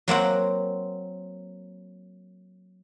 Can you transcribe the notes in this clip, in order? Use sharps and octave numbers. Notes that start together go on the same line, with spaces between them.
F#3 A#3 C4 F#5